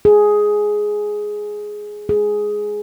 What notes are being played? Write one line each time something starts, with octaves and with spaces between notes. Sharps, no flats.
G#4
G#4